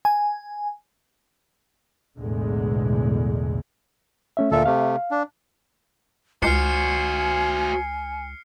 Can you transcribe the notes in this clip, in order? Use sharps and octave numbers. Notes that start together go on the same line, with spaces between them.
G#5
B1 E2 A2 D3 G#3
A3 C#4 E5
D2 A#2 A4 E5 F5
C3 A3 F5
D4
C#2 F#4 C5 G#5 F6 C7 C#7